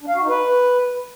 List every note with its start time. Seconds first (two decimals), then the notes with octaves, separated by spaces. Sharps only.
0.01 D4
0.08 F5
0.15 F#4
0.22 D#4
0.29 B4